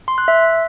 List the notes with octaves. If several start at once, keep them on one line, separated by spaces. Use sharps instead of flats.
C6
F#6
E5